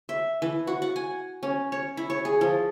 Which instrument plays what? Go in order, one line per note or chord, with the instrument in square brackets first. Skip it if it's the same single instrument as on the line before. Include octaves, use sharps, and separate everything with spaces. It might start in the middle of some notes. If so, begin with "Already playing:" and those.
[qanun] E5
E3
F#4
F#5
G#5
C#4
C#5
E4
C#5
G#4
F3